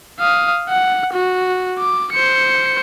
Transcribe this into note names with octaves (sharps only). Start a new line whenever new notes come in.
F5 D#6
F#5
F#4
D6
C5 C#7